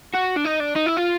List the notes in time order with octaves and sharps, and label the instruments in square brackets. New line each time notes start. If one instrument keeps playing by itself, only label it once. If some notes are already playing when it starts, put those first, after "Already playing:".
[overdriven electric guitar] F#4
D4
D#4
D4
D#4
E4
F4